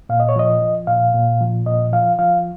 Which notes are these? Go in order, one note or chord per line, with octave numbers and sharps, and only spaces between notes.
A#2 F5
D#5
C#5
F3 D#5
F3
A#2 F5
A#2
F3
A#2 D#5
F3 F5
F3 F5